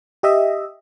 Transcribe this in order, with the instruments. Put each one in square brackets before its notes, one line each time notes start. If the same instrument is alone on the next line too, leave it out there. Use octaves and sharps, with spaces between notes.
[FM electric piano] G4 D#5 E5